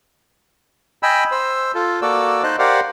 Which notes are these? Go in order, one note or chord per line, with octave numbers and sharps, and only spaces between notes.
D#5 G5 G#5 B5 E6
C5 E6
F4 A4
A#3 F#4 A4 D5 E6
D#4 C5 D#5 A5 F#6
G4 A#4 C5 D5 F5 F#5